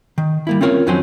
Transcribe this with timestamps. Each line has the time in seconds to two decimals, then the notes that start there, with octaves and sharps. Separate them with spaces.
0.18 D#3
0.47 G3 A#3 E4
0.61 C4 C#4 F4 A#4 C#5
0.87 F2 D#3 F#3 C4 C#4 C6